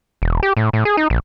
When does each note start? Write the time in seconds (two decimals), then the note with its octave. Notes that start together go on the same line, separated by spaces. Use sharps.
0.22 E1
0.43 G4
0.57 A2
0.73 A2
0.85 G#4
0.97 D#4
1.10 A#1